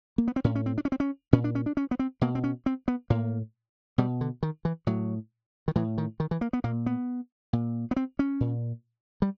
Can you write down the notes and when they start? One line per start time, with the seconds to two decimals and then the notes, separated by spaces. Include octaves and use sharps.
0.18 A#3
0.28 B3
0.36 C4
0.44 A2 C#4
0.55 C#4
0.66 C4
0.78 D4
0.85 C#4
0.92 C4
1.00 C#4
1.33 A#2 C#4
1.44 D4
1.55 C#4
1.66 D4
1.77 C#4
1.91 B3
1.99 C4
2.21 B2 A#3
2.35 C4
2.44 C#4
2.66 C4
2.88 B3
3.10 A2 A#3
3.98 B2 G3
4.21 D3
4.43 D#3
4.65 E3
4.87 A2 F#3
5.68 D#3
5.76 A2 E3
5.98 D#3
6.20 D#3
6.31 E3
6.41 A#3
6.53 B3
6.64 A#2 A#3
6.86 B3
7.53 A#2
7.91 B3
7.96 C4
8.19 C#4
8.40 A#2
9.22 G3